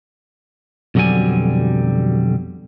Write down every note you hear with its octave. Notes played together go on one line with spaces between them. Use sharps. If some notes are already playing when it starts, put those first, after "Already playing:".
B1 F2 D3 F#3 G3 G#5